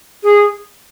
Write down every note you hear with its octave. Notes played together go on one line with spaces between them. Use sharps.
G#4